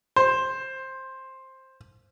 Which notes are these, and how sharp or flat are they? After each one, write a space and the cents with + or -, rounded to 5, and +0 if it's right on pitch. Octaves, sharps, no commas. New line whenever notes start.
C5 +10